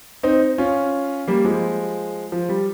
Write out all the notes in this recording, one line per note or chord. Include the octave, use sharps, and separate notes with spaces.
C4 D#4
C#4 F4
G3 A#3
F3 G#3
F3
G3